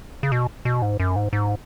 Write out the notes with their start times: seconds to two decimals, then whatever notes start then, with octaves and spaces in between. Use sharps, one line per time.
0.23 C#3
0.32 B2
0.65 B2
0.82 G#2
1.00 F#2
1.16 G#2
1.33 G#2